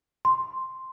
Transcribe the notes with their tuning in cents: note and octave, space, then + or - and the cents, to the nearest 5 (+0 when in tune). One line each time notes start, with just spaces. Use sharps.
C6 +0